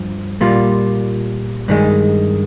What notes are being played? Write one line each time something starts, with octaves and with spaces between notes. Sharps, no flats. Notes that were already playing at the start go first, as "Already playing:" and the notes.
Already playing: G2 F3
A#2 G3 A#3 F4
G2 D#3 G#3